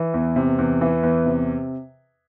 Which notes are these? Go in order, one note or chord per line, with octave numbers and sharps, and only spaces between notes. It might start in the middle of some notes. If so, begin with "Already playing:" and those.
Already playing: E3
E2
C3
E2
E3
E2
C3